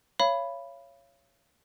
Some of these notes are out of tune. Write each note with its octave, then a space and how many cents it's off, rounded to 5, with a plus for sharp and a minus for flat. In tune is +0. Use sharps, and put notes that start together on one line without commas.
C#5 +0 F5 -40 B5 +0